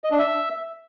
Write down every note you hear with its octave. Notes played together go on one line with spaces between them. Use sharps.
D#5
D4
E5